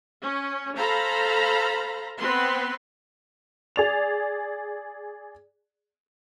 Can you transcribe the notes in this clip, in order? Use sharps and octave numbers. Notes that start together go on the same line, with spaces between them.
C#4
A4 C5 F5 A#5 B5
B3 C4 B4 C6
G#4 D5 F7